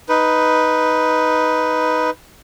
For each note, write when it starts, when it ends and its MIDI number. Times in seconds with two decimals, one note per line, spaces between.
0.09 2.10 63
0.09 2.10 71